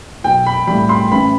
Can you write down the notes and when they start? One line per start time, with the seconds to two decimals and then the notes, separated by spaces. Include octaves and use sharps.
0.24 B1 G5
0.46 B5
0.67 A2 G3 B5
0.89 C6
1.12 A1 B5